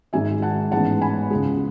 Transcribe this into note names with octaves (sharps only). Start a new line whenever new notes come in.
G#1 G#2 G#3 E5 G#5
F#5 A5
A1 G#2 G#3 B3 F#5 A5
G#5 B5
C#2 C#3 G#3